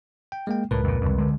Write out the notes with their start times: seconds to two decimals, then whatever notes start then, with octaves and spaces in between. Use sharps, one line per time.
0.32 G5
0.47 G#3 A#3 G5
0.71 C#2 A2 A#4 B4
0.84 F2 A#2
1.01 C2 F2
1.18 D3 G#3